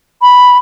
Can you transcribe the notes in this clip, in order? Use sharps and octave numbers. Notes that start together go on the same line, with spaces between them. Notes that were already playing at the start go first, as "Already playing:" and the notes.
B5